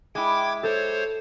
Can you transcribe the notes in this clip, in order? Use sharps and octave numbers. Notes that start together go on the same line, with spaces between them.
G#3 E4 G5 D6 G#6
A4 C5 C#5